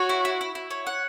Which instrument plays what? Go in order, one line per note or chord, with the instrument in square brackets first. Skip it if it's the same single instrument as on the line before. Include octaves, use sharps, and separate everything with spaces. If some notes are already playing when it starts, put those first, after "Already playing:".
Already playing: [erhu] F#4 [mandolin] C#5
[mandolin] E4
E4
E4
E4
C#5
F#5